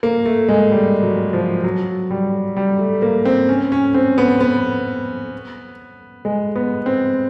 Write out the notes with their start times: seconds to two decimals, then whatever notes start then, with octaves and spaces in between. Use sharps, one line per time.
0.03 A#3
0.25 A3
0.49 G#3
0.72 G3
1.03 F#3
1.33 F3
1.64 F#3
2.10 G3
2.57 G3
2.79 A3
3.02 A#3
3.25 C4
3.49 C#4
3.72 C#4
3.94 C4
4.18 B3
4.41 B3
6.25 G#3
6.56 B3
6.86 C4